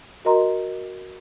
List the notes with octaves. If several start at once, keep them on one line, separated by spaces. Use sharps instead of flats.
F#4 A#4 D#5 A#5 C6